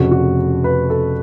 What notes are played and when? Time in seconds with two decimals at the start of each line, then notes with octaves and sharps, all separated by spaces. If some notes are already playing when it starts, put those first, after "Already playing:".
Already playing: F1 F2 C#3 F#4
0.11 F#4
0.64 B4
0.90 A4